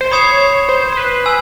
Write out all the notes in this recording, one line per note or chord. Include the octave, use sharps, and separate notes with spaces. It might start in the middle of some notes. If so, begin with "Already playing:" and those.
C5
C#5 B5 D#6 G#6 C7 E7
C5
C5
B4
G#5 E6